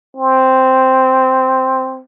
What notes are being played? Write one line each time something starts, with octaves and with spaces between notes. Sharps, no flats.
C4